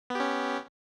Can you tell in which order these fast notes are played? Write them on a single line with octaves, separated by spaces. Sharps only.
B3 G4 C#4